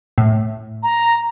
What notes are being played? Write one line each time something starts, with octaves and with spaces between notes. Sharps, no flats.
A2
A#5